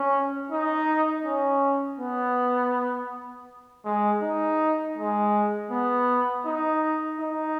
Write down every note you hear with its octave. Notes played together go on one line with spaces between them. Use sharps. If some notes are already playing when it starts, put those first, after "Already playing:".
Already playing: C#4
D#4
C#4
B3
G#3
D#4
G#3
B3
D#4
D#4